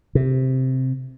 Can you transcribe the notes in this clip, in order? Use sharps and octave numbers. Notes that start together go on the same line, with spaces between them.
C3